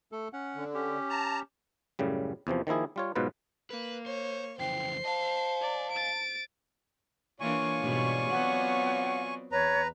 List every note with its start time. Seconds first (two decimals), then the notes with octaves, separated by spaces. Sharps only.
0.12 A3 A4
0.33 C#4 F#5
0.55 D3
0.74 C#4 G4
1.10 A5 A#5
1.99 F#2 A2 C#3 G3
2.47 E2 C3 E3 F3
2.67 D#3 F3 A#3 E4 G#4
2.96 G3 F4 C#5
3.15 G#2 B2 F#3 F4 B4
3.71 A#3 B4
4.06 C5 C#5
4.59 F2 C#3 E3 C5 G5 C7
5.05 D#5 F5 A5
5.61 D5
5.92 A6 D7
7.40 E3 A#3 D4 F4 C#5 D5 G#5 C#6
7.81 G#2 B2 G3
8.30 F#3 B3 C4 F#5
9.52 E2 B4 C#5 A#5